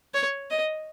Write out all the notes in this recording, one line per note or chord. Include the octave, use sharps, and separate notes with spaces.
C#5
D#5